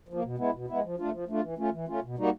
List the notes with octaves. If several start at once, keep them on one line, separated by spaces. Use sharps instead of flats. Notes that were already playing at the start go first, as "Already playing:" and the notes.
F3 A#3
B2
G#3 B3 E4
B2
G#3 B3 E4
F3
A3 D4 F4
F3
A3 D4 F4
E3
A3 C#4 F4
E3
A3 C#4 F4
B2
G3 A#3 D#4 F#4